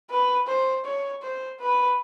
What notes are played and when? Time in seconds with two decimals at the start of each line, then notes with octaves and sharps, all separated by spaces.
0.10 B4
0.47 C5
0.85 C#5
1.22 C5
1.59 B4